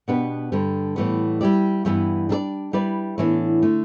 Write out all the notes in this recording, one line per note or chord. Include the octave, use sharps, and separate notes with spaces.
B2 B3 D4 G4 B4
G2 D3 G3
A2 E3 G3 B3
G3 E4 G4 D5
G2 E3 G3 B3 E4
G3 D4 A4 D5
G3 E4 B4 D5
A2 E3 B3 D4
D3 A3